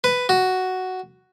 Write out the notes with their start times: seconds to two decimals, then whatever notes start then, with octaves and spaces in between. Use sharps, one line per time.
0.04 B4
0.29 F#4